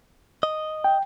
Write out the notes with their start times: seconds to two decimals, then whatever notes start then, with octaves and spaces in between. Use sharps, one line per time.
0.43 D#5
0.84 G5